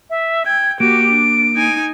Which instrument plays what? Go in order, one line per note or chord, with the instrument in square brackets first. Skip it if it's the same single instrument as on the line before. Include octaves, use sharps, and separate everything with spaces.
[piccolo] E5
[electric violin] G5 [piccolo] G#6
[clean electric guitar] A#3 [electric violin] F#4 G4 [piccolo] D7
[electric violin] D4
D#4 G#5